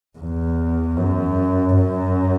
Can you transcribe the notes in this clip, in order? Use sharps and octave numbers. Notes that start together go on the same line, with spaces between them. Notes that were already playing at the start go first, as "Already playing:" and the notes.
E2
F#2
F#2